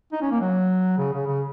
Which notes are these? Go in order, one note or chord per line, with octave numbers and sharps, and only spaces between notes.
D#4
C#4
A#3
F#3
C#3
C#3
C#3